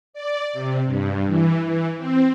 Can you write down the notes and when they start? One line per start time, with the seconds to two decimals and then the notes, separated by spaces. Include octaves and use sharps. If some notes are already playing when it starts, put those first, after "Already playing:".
0.14 D5
0.53 C3
0.86 G2
1.27 E3
1.65 E3
1.98 C4